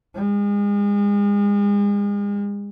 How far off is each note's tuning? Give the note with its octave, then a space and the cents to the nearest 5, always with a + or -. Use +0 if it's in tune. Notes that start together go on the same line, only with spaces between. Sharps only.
G#3 -35